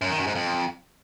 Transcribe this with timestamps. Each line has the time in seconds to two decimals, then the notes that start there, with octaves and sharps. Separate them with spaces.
0.01 F#2
0.10 D#3
0.18 F#2
0.27 G#2
0.35 F2